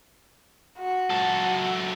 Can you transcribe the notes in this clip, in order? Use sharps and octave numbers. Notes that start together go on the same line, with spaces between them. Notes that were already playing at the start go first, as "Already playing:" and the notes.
F#4
F#2 A4